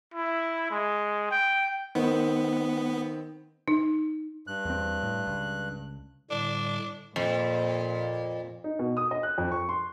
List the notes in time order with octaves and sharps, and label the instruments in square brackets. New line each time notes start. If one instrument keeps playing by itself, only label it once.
[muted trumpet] E4
G#3
G5
[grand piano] D#3 C4 [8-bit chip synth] B3
[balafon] D#4
[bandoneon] G2 F#6
[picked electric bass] E2 C4
A2
C#2
[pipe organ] A2 D3 G3 [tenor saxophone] D4
[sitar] F2 [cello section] A#2
[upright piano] D#4
B2
D#6
D#5
F#6
F2
C#6
C6